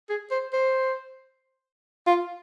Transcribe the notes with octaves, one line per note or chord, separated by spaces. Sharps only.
G#4
C5
C5
F4